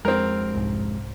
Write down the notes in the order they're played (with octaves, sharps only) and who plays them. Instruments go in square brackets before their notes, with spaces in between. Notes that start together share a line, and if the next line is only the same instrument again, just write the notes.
[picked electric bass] F2 G#3 [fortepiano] C4 A#4 [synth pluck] F6
[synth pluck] C2 G#2